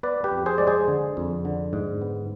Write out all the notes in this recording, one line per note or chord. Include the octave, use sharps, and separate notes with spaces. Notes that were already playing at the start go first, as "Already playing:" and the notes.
B3 B4 D5
G4 B4
F2
G#4 C5
G#3 D5
G#4 C5
D3
F2
D3
G#2
B3